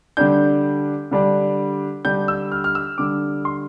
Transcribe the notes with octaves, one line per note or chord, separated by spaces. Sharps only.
D3 G3 D4 G6
D3 G3 D4
D3 G3 D4 G6
E6
F6
F6
E6
D3 G3 D4 D6
C6